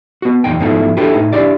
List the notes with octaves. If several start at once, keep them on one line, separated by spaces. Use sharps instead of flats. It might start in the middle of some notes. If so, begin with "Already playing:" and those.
B3 F#4
B1 E2 A#2 D#4 G5
G#2 B2 F3 A3 D#4 E4
D4 E4 F#4 G4 A4 B4
A2 D#4
D4 E4 G4 D5